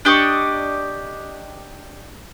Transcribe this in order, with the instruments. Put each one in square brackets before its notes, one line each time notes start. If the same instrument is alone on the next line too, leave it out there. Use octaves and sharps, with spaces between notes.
[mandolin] D4 G4 D#5 C#6